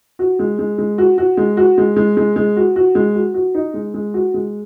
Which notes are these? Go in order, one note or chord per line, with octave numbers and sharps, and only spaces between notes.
F#4
G#3
G#3
G#3
F#4
F#4
G#3
F#4
G#3
G#3
G#3
G#3
F#4
F#4
G#3
F#4
F#4
D#4
G#3
G#3
F#4
G#3